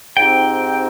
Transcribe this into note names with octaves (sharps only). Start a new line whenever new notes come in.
G#2 F3 C4 D#4 G4 G5